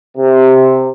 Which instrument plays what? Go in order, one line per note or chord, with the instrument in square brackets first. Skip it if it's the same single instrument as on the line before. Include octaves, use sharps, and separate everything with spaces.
[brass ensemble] C3